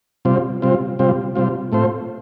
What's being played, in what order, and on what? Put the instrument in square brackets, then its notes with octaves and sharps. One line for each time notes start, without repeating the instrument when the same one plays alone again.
[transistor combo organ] C3 G3 C4 F4
C3 G3 C4 F4
C3 G3 C4 F4
C3 G3 C4 F4
A2 A3 C4 F4 C5